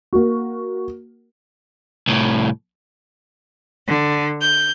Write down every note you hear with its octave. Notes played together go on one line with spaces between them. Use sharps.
A#3 F#4
C2 A2
D3
G6